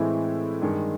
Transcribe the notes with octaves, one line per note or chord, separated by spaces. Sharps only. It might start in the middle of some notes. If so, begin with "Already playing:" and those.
Already playing: A2 E3 G#3 C4 E4
G2 D#3 G#3